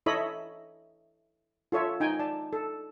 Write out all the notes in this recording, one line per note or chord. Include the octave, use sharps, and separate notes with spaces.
E4 A4 C#5 D#5 E5 B5
F4 A4 C#5 E5
D#4 G5 G#5
D5 A5
A4